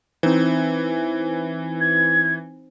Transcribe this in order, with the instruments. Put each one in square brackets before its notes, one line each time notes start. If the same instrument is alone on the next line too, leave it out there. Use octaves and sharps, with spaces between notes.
[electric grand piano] E3 [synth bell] C4 D#4 C5
[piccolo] G#6